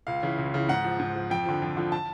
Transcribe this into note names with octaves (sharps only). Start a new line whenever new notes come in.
C#2 F5
C#3 E3
C#2
C#3 E3
G#2 F#5
F3
G#2
F3
F2 G5
D3 F3
F2
D3 F3
A5